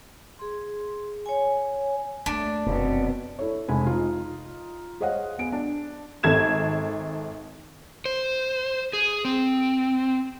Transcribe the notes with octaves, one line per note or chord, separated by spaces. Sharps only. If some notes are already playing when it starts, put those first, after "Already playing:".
G#4 C6
C#5 G#5
D#2 A3 D4
F1 F#2 B2 B3 C4
E4 A4 C#5
F1 G#3 G#5 B5
D#4 F4
G#4 C5 C#5 D#5 F5 F#5
B3 G#5 D7
D4
G#1 A4 G#6 E7
C5
G#4
C4